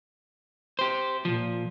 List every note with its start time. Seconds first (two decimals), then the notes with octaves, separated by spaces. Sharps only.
0.79 G4 C5
1.25 A#2 F3